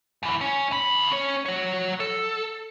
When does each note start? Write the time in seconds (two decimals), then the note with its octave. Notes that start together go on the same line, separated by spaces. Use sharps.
0.23 F#2 E3
0.41 C#4
0.71 D2 B5
1.11 C#4 C#5
1.46 F#3 C#5
2.00 A4